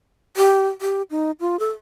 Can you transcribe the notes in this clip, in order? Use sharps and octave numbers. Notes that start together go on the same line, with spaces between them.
G4
G4
D#4
F4
A4